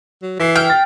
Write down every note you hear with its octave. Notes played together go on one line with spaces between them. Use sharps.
F#3
E3 B6 C7
G5 F6
A6